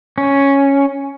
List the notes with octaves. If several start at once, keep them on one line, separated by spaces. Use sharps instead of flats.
C#4